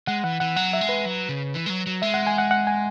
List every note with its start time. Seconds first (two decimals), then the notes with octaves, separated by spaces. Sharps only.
0.07 G#3 F#5
0.24 E3 F#5
0.40 E3 F#5
0.56 F#3 F#5
0.73 E5
0.81 G#3
0.89 B4
1.05 F#3
1.29 C#3
1.54 E3
1.66 G#3
1.69 F#3
1.87 F#3
2.02 G#3 E5
2.14 F#5
2.27 G#5
2.38 F#5
2.51 F#5
2.67 G#5